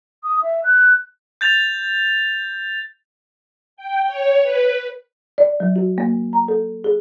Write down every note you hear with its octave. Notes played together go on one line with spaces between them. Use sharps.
D#6
E5
F#6
G6 A6 F7
G5
C#5
B4
D5
F#3
F#4
A#3
A#5
A4
G#4